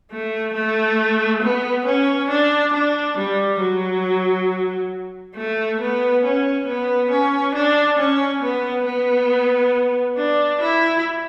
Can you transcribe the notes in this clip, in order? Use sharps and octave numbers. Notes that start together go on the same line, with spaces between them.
A3
A3
B3
C#4
D4
D4
G3
F#3
A3
B3
C#4
B3
C#4
D4
C#4
B3
B3
D4
E4